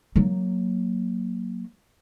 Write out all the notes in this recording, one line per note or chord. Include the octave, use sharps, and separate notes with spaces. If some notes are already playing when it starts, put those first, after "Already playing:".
F#3 A#3